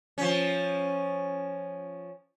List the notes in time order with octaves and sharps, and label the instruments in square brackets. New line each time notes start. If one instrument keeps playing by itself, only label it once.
[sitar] F3 C#4